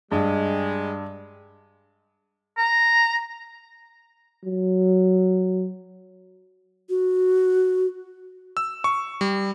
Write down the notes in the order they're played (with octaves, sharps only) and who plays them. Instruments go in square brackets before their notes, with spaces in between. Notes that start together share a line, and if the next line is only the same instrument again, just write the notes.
[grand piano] G2 [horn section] G3 G#3
[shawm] A#5
[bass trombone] F#3
[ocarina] F#4
[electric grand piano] E6
C#6
G3